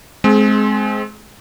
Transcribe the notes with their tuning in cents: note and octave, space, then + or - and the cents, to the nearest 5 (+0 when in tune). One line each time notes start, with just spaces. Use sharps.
G#3 +25 C4 +0 G#4 +40